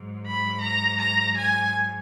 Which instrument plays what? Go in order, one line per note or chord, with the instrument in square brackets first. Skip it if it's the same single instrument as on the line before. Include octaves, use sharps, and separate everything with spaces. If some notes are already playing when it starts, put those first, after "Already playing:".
Already playing: [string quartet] G#2 F#3
B5
A#5
A#5
G#5